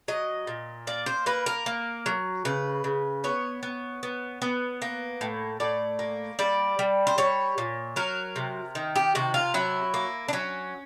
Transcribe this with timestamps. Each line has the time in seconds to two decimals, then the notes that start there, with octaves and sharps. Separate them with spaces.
0.08 F#3 D#5
0.47 A#2
0.87 A#3 D5
1.06 C5
1.26 A#3 B4
1.46 A#4
1.66 A#3
2.06 F#3
2.45 C#3 B4
2.84 C#3
3.24 B3 C#5
3.63 B3
4.03 B3
4.42 B3
4.82 A#3
5.21 A2
5.60 A2 D5
5.99 A#3
6.39 G3 D5
6.79 G3
7.07 C5
7.18 G3 C#5
7.58 A#2
7.96 F#3 A#4
8.36 C3
8.75 D#3
8.96 G4
9.15 C3 F#4
9.34 F4
9.54 F#3 E4
9.94 A#3
10.28 D4
10.33 F#3 C#4